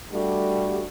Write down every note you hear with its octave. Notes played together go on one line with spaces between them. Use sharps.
G3 A3 D4 F#4 G4 A4